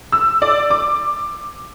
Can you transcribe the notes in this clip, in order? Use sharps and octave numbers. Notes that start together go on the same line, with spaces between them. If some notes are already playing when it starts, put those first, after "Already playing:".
E6
D5
D6